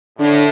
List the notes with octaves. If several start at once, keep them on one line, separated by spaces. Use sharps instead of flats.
A2 D3